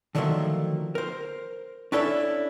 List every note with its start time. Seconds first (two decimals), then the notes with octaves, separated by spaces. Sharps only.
0.15 D3 D#3 F3 F#3 A3 A#3
0.95 A#4 C5
1.92 C#4 D4 E4 A4 B4 C#5